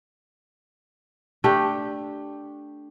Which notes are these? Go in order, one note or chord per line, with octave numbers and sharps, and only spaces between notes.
A3 D4 G4